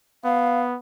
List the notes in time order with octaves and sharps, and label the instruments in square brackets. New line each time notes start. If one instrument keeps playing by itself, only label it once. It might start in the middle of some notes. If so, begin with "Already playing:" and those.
[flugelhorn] B3 [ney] F5